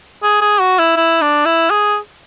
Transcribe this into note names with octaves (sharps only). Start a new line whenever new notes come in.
G#4
G#4
F#4
E4
E4
D4
E4
G#4